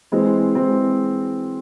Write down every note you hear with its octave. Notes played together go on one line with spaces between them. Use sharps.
E3 G#3 C4
E3 G#3 C4